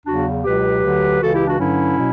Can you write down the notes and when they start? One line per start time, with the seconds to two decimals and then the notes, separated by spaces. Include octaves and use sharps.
0.06 E2 C#3 F#3 D4 F#4
0.44 C#2 B2 F#3 G4 B4
0.83 D2 D3 F#3
1.21 C#2 C#3 E3 F#4 A4
1.34 E4 G4
1.46 D4 F#4
1.59 G2 D3 F#3 C#4 E4
1.97 B2 F#3